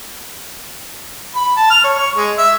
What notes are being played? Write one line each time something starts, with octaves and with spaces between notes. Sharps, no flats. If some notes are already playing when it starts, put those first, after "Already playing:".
B5
A5
F6
C#5
C#6
G#3
E5